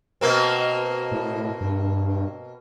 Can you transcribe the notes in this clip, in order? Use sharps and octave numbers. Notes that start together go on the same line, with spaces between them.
B2 A#3 C4
A2
G2